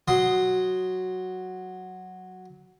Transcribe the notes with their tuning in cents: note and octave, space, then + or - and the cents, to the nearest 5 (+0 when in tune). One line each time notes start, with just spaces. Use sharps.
F#3 +0 C6 +0 D#6 +0